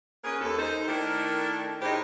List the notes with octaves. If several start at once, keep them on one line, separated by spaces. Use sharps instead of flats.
A#3 C#4 G#4 B4
D#2 A4
D#4 C5
D#3 A3 D4 E4 A#4
A2 D#4 G4 G#4 C5